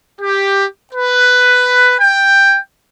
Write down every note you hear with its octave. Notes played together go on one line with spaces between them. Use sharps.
G4
B4
G5